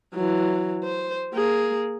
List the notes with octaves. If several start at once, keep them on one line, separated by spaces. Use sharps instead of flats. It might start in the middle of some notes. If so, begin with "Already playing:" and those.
E3 F#3
C5
A#3 G#4